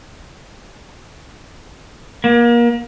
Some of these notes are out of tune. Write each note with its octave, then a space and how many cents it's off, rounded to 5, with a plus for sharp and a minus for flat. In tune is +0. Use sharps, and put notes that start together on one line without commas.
A#3 +30